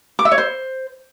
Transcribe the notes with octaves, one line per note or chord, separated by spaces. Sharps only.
D6
E5
C#5
C5